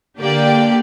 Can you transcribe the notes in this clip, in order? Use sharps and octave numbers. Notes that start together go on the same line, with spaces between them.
D3 A#3 G4 D5 G5